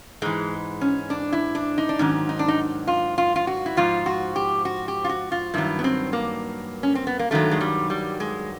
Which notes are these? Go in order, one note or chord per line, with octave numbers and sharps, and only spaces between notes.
G#2 E3 G#3
C#4
D4
E4
D4
D#4
D4
G#2 D#3 F#3 C#4
D#4
D4
D#4
F4
F4
F4
F#4
E4
G#2 F3 F4
F#4
G4
F#4
G4
F4
F#4
F4
G2 D#3 F#3 E4
B3
C4
A#3
C#4
C4
B3
A#3
G2 D#3 F#3 A3
G#3
G3
G3
G#3